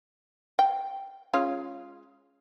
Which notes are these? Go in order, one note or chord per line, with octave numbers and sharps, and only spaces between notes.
G5
G#3 C#4 F4